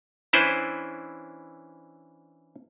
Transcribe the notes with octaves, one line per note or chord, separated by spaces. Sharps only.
E3 C#4 D4 E4 B4 C5